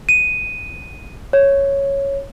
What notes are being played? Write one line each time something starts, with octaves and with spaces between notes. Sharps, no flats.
D#7
C#5